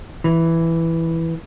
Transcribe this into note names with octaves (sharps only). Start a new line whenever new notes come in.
E3